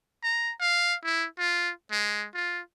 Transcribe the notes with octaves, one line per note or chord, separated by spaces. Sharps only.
A#5
F5
E4
F4
G#3
F4